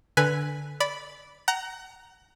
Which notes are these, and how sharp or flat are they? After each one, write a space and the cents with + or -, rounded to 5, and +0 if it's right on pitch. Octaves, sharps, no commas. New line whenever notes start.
D3 +0 B4 +0 G#5 +0
D5 -15 B5 +0
F#5 +30 A#5 +0